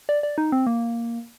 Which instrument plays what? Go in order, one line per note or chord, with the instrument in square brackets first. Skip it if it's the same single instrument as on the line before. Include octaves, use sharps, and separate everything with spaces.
[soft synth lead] D5
D5
D#4
C4
A#3